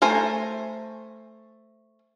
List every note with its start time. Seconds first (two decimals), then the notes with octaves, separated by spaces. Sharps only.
0.02 A3 C5 G#5 A#5